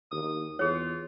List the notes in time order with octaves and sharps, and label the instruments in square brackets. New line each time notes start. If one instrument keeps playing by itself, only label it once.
[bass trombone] D#2 [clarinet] D#6
[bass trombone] E2 [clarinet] F4 [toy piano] G#4 C#5